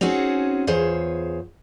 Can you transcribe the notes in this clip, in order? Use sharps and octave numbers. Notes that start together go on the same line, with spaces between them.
C4 C#4 D#4 F#4 G#4
E2 F4 G#4 C5 C#5